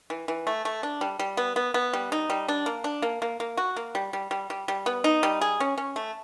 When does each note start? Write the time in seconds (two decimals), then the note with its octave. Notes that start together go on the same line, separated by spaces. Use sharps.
0.10 E3
0.28 E3
0.47 A3
0.65 A3
0.83 D4
1.01 G3
1.19 G3
1.37 B3
1.56 B3
1.74 B3
1.93 G3
2.12 D#4
2.30 G3
2.48 D4
2.66 A#3
2.84 D4
3.02 A#3
3.22 A#3
3.40 A#3
3.57 F#4
3.76 A#3
3.95 G3
4.13 G3
4.31 G3
4.50 G3
4.68 G3
4.86 B3
5.04 D#4
5.23 G3
5.41 G#4
5.60 C#4
5.78 C#4
5.96 A3